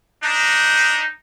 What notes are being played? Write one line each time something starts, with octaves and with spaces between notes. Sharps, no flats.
D4 D#4